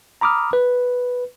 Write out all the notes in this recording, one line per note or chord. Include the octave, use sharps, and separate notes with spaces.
A#5 B5 D6 D#6 F6
B4